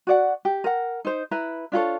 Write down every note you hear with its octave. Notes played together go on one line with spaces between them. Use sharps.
F#4 D5 F#5
G4
A#4 F#5
D#4 C5
E4 B4 A#5
D4 F4 A4 C#5